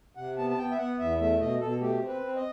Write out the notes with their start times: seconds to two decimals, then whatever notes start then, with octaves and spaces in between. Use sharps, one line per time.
0.16 C3 F#5
0.38 B3 A5
0.50 A5
0.58 B3 G5
0.71 E5
0.78 B3 F#5
0.99 E2 E5
1.20 A3 E5
1.40 B2 D#5
1.61 B2 A4
1.80 A3 G4
2.01 C4
2.08 B4
2.22 C4
2.36 D#5